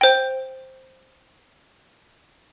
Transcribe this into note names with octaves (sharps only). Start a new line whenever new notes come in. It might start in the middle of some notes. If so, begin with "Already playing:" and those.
C5 G5